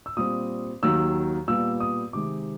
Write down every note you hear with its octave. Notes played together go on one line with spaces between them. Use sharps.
E6
A#2 G3 C4 D#6
D#2 D#3 F#3 E6
A#2 G3 B3 E6
D#6
C3 D#3 G#3 D6